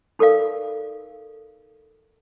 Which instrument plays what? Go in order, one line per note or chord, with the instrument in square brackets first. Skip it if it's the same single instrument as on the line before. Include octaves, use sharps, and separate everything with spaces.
[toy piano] D#4 A4 A#4 D5 F5